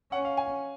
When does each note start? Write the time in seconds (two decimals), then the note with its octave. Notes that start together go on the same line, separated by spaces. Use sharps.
0.11 C#4 F#5
0.25 F5
0.37 G#5